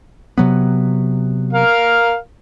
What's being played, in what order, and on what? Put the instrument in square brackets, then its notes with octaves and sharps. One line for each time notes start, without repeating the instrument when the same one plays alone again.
[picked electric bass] C3 F#3 B3
[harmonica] A#4 F5